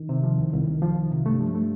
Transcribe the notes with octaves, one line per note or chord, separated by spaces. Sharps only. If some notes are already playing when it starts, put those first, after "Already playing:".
Already playing: D#3
C3
F3
C2
C2
C2
F3
C2
C3
G2 A3
F3
A3